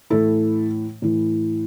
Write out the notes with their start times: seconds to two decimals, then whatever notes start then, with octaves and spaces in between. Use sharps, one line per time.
0.10 A2 E3 E4 A4
1.02 A2 E3